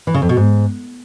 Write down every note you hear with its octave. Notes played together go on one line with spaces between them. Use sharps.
E3
C#3
F2
B2
G#2